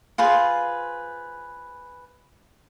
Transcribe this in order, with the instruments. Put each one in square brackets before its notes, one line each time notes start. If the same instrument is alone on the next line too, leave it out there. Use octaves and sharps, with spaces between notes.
[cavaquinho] F4 G#4 B4 C5